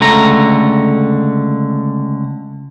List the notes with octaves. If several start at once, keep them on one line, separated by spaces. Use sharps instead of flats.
C#2 D3 A3 A#5